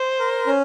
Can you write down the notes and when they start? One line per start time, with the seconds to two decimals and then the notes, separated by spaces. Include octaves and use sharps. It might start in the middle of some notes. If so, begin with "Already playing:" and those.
Already playing: C5
0.19 A#4
0.47 C#4